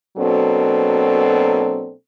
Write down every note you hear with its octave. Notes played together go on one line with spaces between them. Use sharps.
B2 F#3 A#3 C4 D4 A4